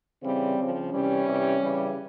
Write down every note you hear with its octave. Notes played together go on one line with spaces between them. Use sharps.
C#3 E3 G3 C4
C#3 F3
C3 E3 G3 C#4
C3 E3 G3
C#3 E3 G3